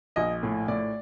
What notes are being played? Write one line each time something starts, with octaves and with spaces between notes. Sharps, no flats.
A#1 D#5
A2
A2 D5